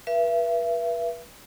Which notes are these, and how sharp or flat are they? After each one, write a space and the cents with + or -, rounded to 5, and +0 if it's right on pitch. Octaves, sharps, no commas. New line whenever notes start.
B4 -35 E5 +35